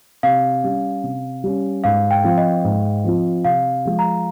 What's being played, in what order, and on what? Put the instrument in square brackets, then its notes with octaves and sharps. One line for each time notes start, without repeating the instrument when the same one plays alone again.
[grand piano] C3 [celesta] F5
[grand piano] G3 C#4
C3
G3 C#4
[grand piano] G#2 [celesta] F5
[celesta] G5
[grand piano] F3 C4 F4 [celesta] F5
[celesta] D#5
[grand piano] G#2
F3 C4 F4
[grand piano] C3 [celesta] F5
[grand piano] F3 G#3
[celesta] A#5